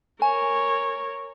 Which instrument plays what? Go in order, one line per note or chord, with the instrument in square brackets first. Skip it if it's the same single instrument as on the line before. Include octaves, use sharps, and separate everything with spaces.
[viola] A#4 C#5 [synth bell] G#5